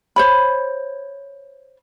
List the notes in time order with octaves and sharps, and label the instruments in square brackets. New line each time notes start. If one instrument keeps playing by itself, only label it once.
[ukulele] C5 C#5 B5